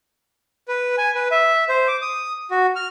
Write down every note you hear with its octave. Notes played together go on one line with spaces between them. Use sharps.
B4
G#5
B4
E5
C5
D6
D#6
F#4
F6